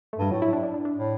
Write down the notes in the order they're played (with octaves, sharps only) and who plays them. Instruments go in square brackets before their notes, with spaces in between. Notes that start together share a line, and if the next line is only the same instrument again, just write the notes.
[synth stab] A3
[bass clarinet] G2 [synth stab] G3
[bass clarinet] A2 [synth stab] F#3
[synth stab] E4
D4
D4
D4
D4
[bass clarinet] A2